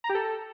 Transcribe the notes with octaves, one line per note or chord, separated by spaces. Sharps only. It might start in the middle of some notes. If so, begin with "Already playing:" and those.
A#5
G4
A4